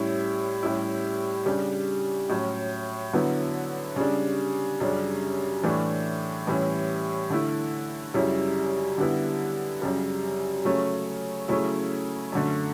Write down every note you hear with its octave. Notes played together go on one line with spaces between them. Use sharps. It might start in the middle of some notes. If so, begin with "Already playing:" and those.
Already playing: A2 G3 C#4 E4
A2 G3 C#4 E4
C#3 G3 D4
A2 F#3 C#4
D3 F#3 B3 E4
C#3 G3 D4
F#2 C#3 G3 D4
A2 E3 A3 D4
A2 E3 G3 C#4 E4
D3 A3 E4
F#2 C#3 G3 C#4 E4
D3 G3 B3 E4
F#2 C#3 G3
C#3 F#3 A3 C#4
C#3 F#3 A3 C#4 E4
F#2 D3 A3